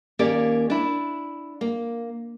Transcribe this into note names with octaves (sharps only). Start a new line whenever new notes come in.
D#2 A#3 C#4 G4 A#4 D5
D4 E4
A#3